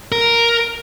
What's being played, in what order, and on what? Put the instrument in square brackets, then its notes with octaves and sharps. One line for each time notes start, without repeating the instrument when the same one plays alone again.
[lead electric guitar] A#4